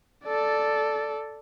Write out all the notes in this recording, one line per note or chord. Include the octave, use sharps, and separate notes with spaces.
A4 D5